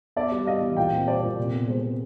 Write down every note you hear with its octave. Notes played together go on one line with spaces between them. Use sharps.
B3 D5 E5
G3
B3 D#5 F5
E3
A#2 F5 G5
C4
G3 C5 D5
A#2
C3
B3
G#3 C5
C3